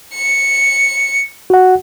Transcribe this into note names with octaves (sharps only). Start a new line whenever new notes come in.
C#7
F#4 F#5